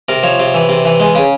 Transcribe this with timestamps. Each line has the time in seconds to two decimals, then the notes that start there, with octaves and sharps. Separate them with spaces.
0.09 C3 A#4
0.23 F3 C#5
0.39 C3
0.54 E3
0.69 C3
0.85 E3
1.00 G#3
1.15 C#3